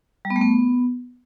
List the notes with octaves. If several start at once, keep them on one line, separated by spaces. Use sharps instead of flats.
G3
B3
A3
B3